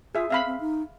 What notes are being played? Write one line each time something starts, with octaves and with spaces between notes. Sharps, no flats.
F4 G#4 E5
C4 E5 F5 B5
C4
D#4